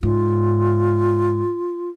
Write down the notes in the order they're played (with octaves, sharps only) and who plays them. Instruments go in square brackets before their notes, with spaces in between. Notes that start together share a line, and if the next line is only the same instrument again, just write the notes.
[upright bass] G#2 [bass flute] F4